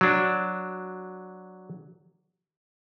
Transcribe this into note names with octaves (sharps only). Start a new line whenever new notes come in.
F#3 D4